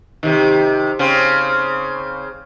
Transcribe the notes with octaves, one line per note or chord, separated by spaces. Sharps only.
C3 D#3
C#3 C4